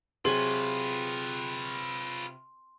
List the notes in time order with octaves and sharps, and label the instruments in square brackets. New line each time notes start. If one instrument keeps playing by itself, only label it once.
[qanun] C3 F#3 C#6 [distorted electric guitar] F4 B4 [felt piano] G#4 [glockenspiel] C6